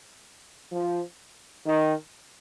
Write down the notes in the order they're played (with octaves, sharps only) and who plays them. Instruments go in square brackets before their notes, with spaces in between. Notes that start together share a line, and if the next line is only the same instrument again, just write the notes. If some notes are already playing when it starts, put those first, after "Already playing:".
[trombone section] F3
D#3